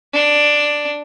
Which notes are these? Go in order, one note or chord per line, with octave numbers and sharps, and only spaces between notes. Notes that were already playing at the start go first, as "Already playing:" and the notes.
D4